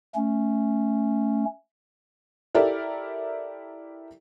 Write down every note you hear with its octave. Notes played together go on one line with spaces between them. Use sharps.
A3 C#4
E4 G4 A4 A#4 D5